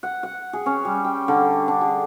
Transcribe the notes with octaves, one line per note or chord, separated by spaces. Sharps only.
F#5
F#5
G#4
C#4
G3
G5
D3
D4
G#4